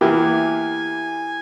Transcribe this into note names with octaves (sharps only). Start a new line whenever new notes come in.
E2 E3 A#3 E4 G4 G#5